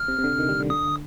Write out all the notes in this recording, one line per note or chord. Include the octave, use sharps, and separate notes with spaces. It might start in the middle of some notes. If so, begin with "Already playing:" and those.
Already playing: F6
C3
C3
D3
D#3
G3
D3
D3 D#6